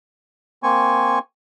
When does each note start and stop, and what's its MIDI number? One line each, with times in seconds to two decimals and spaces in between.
0.63 1.19 58
0.63 1.19 60
0.63 1.19 80
0.63 1.19 85